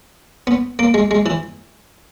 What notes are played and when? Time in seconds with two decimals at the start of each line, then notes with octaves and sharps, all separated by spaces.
0.47 B3
0.79 A#3
0.94 G#3
1.11 G#3
1.26 E3